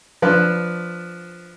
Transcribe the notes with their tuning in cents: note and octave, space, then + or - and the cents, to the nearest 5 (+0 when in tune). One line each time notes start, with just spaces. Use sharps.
F3 +0 D4 +0 B4 +0